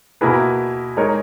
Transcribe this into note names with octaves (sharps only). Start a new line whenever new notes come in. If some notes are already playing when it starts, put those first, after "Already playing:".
B2 A#3 E4 G#4 B4
G#3 D#4 A#4 C#5